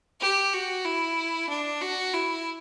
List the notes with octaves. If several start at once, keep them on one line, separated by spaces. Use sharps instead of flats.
G4
F#4
E4
D4
F#4
E4